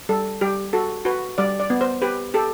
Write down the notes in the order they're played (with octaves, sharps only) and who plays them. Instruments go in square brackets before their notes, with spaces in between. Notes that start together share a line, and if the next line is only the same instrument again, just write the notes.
[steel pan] G3 A4
G3 G4
F#4 A4
F#4 B4
G3 D5
D5
B3
C5
G4 B4
G4 A4